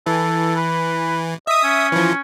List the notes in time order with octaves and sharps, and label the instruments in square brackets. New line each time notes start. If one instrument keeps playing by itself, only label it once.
[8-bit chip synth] E3 [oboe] A4
[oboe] B4
[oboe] D#5 [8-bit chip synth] E5 D#6
[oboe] C#4
[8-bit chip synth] E3 F3